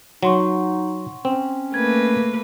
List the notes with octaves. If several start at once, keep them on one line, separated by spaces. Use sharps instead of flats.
F#3 D#4 F#5 C6 C#6
C4 C#4
A3 A#3 B4 G#6